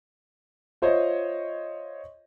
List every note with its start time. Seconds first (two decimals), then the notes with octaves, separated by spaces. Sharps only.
0.82 F4 C5 C#5 D#5 E5